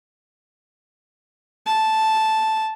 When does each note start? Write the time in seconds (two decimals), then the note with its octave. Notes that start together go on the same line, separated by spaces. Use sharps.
1.67 A5